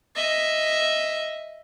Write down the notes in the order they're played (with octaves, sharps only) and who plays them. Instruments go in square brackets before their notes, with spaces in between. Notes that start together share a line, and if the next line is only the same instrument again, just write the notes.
[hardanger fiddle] D#5 E5